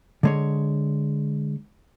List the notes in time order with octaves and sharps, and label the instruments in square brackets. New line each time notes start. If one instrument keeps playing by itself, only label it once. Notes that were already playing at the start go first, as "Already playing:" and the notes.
[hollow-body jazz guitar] D3 G#3 C#5